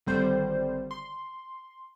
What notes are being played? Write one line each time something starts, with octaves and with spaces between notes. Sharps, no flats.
G#1 D3 G3 C5
C6